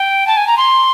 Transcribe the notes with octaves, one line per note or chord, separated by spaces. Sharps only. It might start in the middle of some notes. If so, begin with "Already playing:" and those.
Already playing: G5
A5
G#5
A#5
C6